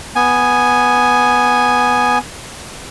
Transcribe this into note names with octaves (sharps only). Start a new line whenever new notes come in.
B3 G#5